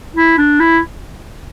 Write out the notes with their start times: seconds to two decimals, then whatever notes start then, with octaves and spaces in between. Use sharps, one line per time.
0.16 E4
0.38 D4
0.60 E4